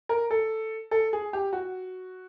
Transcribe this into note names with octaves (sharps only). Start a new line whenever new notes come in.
A#4
A4
A4
G#4
G4
F#4